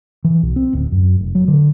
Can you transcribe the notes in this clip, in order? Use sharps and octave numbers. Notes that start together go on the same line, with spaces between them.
E3
B1
C4
D1
F#2
F1
F#3
D3